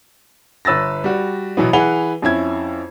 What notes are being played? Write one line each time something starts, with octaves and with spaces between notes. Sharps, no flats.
G1 B4 E6 A6 A#6
G3 F#4
B2 E3 F#3 B3
E3 G#4 B4 F#5 F7 G7
F2 C#4 E4 G#6